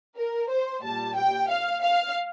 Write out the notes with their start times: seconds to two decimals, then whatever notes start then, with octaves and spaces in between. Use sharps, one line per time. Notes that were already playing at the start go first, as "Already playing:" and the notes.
0.16 A#4
0.49 C5
0.83 A#2 G3 A5
1.16 G5
1.50 F5
1.82 F5